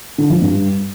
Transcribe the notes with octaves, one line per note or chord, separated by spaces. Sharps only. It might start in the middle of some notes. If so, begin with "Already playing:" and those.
D3
F3
G2